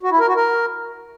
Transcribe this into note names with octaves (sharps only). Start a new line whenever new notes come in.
F#4
E4
A#4
F#4
A#4